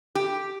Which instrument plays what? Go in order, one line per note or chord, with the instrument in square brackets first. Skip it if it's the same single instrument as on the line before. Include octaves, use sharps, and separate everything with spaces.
[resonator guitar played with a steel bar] G4